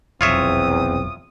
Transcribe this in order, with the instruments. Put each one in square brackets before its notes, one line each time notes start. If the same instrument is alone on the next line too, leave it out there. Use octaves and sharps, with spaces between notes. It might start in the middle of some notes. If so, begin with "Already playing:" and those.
[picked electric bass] F1 B1 [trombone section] E2 C4 [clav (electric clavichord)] F4 C#5 E5 [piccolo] D#6